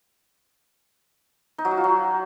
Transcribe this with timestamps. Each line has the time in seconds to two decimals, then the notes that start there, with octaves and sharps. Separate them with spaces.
1.58 D#4
1.65 F#3
1.71 F#4
1.77 F4
1.84 F#3